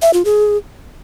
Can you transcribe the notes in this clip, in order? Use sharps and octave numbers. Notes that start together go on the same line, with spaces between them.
E5
F4
G#4